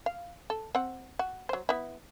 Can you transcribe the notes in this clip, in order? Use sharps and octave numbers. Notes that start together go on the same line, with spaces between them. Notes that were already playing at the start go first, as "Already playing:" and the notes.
F5
A4
C4 F#5
F#4
F#3 C5
B3 E4